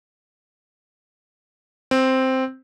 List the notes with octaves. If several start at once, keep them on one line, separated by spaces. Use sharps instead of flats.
C4